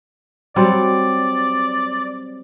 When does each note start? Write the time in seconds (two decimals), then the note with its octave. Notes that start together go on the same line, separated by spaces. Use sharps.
0.56 F#3 G3 C4 D5